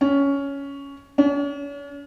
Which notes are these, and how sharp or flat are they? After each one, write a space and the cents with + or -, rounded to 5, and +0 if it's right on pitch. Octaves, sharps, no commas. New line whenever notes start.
C#4 +10
C#4 +40